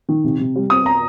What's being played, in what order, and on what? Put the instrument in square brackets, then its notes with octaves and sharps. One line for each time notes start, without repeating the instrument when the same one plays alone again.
[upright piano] D#3
C3
C3
G3
[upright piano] C4 [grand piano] D#6
[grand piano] A#5